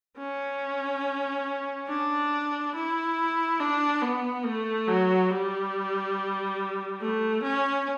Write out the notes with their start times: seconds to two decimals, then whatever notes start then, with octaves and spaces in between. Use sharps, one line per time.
0.18 C#4
1.88 D4
2.75 E4
3.60 D4
4.02 B3
4.45 A3
4.87 F#3
5.31 G3
7.01 A3
7.44 C#4